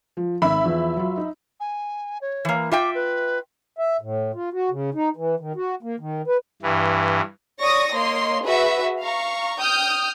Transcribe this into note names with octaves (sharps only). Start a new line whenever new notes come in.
F3
G#1 E5 B5
E2 F3
F#3 F4
D#4
G#5
C#5
E3 A#3
F4 E5 G5 D6
B4
E5
A2
F4
F#4
C#3
D#4
E3
D#3
F#4
A#3
D#3
B4
G2 E3
C#5 D5 C#6 D#6 A#6
A#3 C#5 D#5 C6
F#4 G#4 B4 E5 F#5
F5 A#5 C#6
G5 D#6 F6 G6